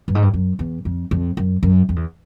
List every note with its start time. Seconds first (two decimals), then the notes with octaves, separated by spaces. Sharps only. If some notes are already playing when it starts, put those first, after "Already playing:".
0.08 G2
0.15 G#2
0.22 G2
0.34 F#2
0.59 E2
0.85 F2
1.11 F2
1.37 F#2
1.63 F#2
1.89 F2
1.96 E2